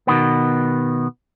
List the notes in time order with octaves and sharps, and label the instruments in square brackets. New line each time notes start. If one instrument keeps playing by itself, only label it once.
[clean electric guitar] B2 D#3 B3